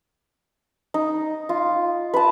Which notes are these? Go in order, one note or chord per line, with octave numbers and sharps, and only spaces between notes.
D#4
F4
B4 A5